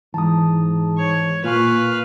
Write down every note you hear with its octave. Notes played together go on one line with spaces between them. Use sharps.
G#2 E3 A5 A#5 D#6
C#5
A#2 A#3 F4 B4 F5 G#5 C#6